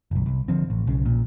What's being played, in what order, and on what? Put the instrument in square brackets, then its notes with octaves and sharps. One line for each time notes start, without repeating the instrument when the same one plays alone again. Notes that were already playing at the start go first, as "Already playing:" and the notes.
[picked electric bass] F#1 B1
C2
D3 F3 C4
A1
B1 C#3
A#1 A#2